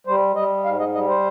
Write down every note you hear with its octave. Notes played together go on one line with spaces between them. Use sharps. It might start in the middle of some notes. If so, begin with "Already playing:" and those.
G3 C5
G3 D#5
G#2 F5
D#5
G3 D#5
C5